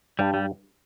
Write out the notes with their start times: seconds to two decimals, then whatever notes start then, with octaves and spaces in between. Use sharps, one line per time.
0.19 G2 G3
0.34 G3